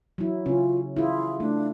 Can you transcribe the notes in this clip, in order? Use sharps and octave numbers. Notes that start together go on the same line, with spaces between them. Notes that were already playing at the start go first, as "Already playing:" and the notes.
F#3 E4
C#3 C#4 F4
E4 F4 G#4
A3 D4